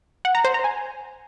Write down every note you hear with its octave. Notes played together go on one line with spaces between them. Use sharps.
F#5
A#5
C5
A#5
G#5